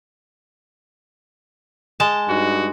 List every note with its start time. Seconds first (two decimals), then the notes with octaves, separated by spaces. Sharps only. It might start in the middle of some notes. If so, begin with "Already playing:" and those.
2.00 G#3 A5
2.29 G2 D#4 F#4